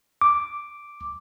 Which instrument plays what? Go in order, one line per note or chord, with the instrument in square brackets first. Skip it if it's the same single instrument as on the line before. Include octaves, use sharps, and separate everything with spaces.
[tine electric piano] D6